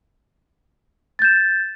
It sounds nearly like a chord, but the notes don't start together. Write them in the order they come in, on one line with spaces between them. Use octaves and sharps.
A6 G6 E7